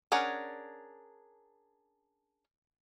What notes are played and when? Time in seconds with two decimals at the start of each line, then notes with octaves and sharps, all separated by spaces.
0.12 C#4 D4 G#4 A#4 F#5